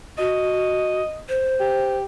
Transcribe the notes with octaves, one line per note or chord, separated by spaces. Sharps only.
F#4 D#5
C5
G4